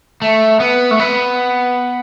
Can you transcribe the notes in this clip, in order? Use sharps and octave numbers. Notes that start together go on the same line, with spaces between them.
A3
B3
A3
B3